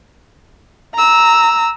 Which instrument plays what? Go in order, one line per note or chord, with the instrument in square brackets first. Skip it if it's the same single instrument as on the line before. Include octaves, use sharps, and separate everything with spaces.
[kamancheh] A#5 E6